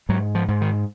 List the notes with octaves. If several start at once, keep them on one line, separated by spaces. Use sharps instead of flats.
G#2 F#3
F3
G#2
D#3